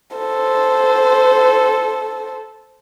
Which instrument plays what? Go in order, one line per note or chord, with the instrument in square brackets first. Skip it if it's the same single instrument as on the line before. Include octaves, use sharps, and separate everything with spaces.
[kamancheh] A4 C5